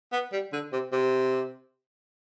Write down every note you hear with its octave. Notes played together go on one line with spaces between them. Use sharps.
B3
G3
D3
C3
C3